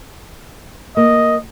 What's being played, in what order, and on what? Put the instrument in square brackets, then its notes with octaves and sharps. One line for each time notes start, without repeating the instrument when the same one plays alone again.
[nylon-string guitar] A#3 [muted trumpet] D#5